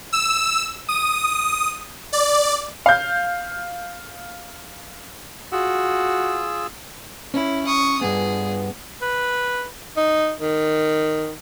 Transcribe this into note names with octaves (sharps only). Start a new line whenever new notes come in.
E6
D#6
D5
F5 G6
F4 F#4 G#4 E6
C#4 E4 C#5
C#6 D#6
G2 B3 G#4
B4
D#4
D#3